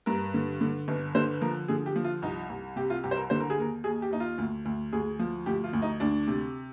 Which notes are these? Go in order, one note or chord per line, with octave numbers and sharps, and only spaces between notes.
G2 A#4
D3
D3
G1
D3 C5
F3 A#4
D3 G#4
G4
F3
F4
C2 D#4
C2
C3 G4
F4
C2 G4
C5
A#4
D3 C5
A#4
G#4
D#2 A#4
D#2 G#4
G4
D#2 D#4
F4
D2
D2
D2 G#4
F3
D2 G4
F4
D2
D#4
D2 D4
C3